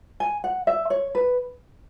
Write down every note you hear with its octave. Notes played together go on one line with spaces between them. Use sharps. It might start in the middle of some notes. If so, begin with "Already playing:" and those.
G#5
F#5
E5
C#5
B4